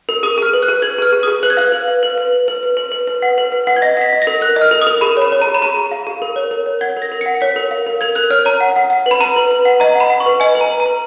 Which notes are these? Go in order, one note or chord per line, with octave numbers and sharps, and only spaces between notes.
A#4
G#4 D#6
G#4 F6
B4
F#6
G#4
B4 G#6
G#4 F6
G#4
G#4 D#6
B4 F#6
G#6
F5 F#6
B4
F5
B4
B4
B4
B4
B4
B4
B4
B4
F#5
B4
B4
F#5
G#6
D#5 A#6
F#5 B6
D#5
A#6
A#4
A#4 F#6
D#5
F6
A#4
D#6
A#4
G#4 B5
C#5 B5
C#5
A#5
G#4
B5
G#4 A#5
G#4
F5
G#4
A#4
C#5
A#4
C#5
F#5 G#6
A#4
A#6
A#4
F#5 C#7
C#5 B6
A#4
F5
A#4
A#4 G#6
A#4 F#6
C#5 F6
C#5 A#5
F#5
F#5
F#5
B4
B5
B4 A#5
B4
B4
F#5
D#5 A#5
F#5
B5
F#5
C#6
B4
D#5 G#5
B4
A#5
B4
A#5
B4